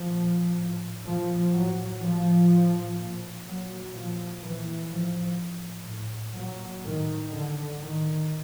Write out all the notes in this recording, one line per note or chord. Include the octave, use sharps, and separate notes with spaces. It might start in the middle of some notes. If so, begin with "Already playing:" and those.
Already playing: F3
A#2
A2
A#2 F3
A2 F#3
A2 F3
A2
A#2
A#2 F#3
A#2 F3
A#2 E3
A2 F3
A2
A2
A#2 F#3
A2 D#3
A2 D3
A2 D#3